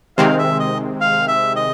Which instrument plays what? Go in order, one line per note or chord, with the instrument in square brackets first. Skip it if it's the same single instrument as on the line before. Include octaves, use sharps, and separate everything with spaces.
[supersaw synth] C3 D#3 G#3 C4 [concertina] F5
[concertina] E5
D#5
F5
E5
D#5